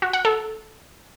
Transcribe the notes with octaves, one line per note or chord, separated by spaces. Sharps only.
F#4
F#5
A4